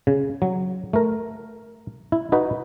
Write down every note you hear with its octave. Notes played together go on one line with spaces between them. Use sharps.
C#3
F#3
A3 A#4
E4
D#4 F#4 B4